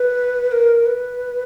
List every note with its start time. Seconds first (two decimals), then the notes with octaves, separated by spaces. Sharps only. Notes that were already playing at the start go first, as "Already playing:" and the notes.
Already playing: B4
0.52 A#4
0.86 B4